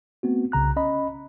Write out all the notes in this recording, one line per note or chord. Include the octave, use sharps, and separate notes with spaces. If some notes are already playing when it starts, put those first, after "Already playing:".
A3 B3 C4 F#4
C2 C#3 A#5 F#6
C#4 D#5 B5